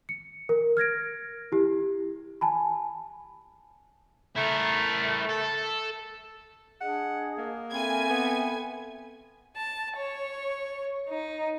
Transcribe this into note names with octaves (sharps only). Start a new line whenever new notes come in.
C#7
A#4
F6 G#6 A#6 D7
E4 G4
G#5 A5 B5
A3 E4 A#4
A4
D4 G#4 D#5 F#5
A#3
C4 A4 E5 G#5 B5 G#6
B3
A5
C#5
D#4